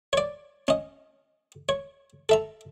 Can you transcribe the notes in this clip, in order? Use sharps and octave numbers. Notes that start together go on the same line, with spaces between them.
C#5 D5
C#4 D#5
C#5
A4 E5 A#5